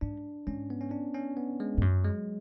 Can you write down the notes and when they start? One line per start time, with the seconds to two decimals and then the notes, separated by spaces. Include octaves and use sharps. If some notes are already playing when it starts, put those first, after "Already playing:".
0.01 G#2 D4
0.47 G#2 C#4
0.70 B3
0.81 C#4
0.91 D4
1.14 C#4
1.37 B3
1.60 G#3
1.78 G#2
1.81 F#2 F#3
2.05 G#3